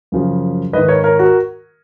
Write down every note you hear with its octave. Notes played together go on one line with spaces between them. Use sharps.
F#2 C#3 F3
G#2 D#3 B4 D#5
A#4 C#5
A#4 C#5
F#4 A#4